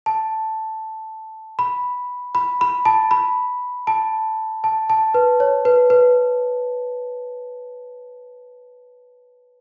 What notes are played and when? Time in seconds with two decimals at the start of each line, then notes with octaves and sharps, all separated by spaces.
0.06 A5
1.59 B5
2.35 B5
2.61 B5
2.85 A5
3.11 B5
3.87 A5
4.64 A5
4.90 A5
5.14 B4
5.40 C#5
5.65 B4
5.90 B4